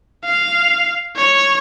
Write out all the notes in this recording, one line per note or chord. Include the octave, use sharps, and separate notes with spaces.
F5
C#5